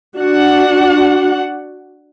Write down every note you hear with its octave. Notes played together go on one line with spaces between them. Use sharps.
D4 F#4 F#5